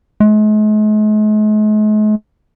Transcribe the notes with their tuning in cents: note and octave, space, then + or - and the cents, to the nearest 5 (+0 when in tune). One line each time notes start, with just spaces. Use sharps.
G#3 +45